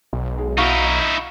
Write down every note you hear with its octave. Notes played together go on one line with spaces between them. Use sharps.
B1
G#3
D#4 E4 F#4 F5 C#6